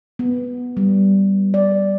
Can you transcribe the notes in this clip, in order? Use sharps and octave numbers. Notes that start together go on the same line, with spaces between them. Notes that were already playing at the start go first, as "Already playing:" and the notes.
B3
G3
D5